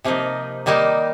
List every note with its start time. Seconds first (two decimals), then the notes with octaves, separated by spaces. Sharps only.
0.04 C3 F3 A#3 D#4
0.66 D#3 G3 A#3 D#4